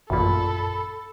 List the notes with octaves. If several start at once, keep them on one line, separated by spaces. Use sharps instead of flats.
A1 F#2 A#2 A4 B5